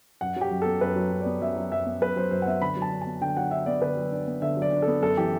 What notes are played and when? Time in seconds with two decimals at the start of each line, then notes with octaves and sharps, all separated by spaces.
0.21 F#2 F#5
0.36 F#3 G4
0.51 F#2
0.62 B3 A4
0.81 F#2 B4
0.96 F#3
1.11 F#2
1.21 B3 D5
1.41 F#2 E5
1.56 F#3
1.71 F#2 E5
1.86 B3
2.01 F#2 B4
2.16 F#3 C5
2.31 F#2 C5
2.42 F#5
2.47 B3 E5
2.62 D3 B5
2.76 F#3
2.82 A5
2.92 D4
3.01 B3 A5
3.21 D3 G5
3.37 F#3 F#5
3.51 D4 E5
3.66 B3 D5
3.81 D3 B4
3.97 F#3
4.12 D4
4.27 B3
4.42 D3 E5
4.57 F#3
4.62 D5
4.72 D4
4.82 A4
4.87 B3
5.02 F#2 A4
5.17 E3 G4